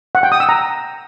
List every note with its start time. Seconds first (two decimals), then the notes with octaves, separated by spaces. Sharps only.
0.15 F#5
0.23 G5
0.32 D#6
0.40 E6
0.49 A#5